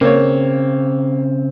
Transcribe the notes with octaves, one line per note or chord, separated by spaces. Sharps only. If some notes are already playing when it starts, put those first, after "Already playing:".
C#3 A#3 C4 C#5